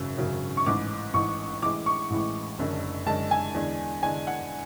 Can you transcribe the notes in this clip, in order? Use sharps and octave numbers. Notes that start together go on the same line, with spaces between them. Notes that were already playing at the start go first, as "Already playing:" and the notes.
Already playing: G#1 F#2 C#3 F#3 C#4
G#1 F#2 C#3 F#3 C#4
C#6
A1 G#2 E3 D6
A1 G#2 E3 C#6
A1 A2 E3 G#3 D6
C#6
A1 A2 E3 G#3
F#1 F#2 D3 G#3 C#4
F#1 F#2 D3 G#3 C#4 A5
G#5
E2 D3 G#3 D4
E2 D3 G#3 D4 G#5
F#5